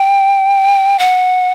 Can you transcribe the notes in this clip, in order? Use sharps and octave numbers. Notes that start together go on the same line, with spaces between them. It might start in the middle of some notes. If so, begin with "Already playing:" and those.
Already playing: G5
F#5